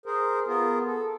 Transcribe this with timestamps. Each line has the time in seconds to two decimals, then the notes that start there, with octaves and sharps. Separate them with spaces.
0.06 G#4 A#4 C5
0.47 B3 F4 G#4 A#4
0.86 A4